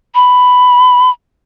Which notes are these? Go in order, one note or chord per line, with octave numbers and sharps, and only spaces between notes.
B5